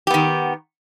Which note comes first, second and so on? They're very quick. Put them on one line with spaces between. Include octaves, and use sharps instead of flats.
G4 B3 D#3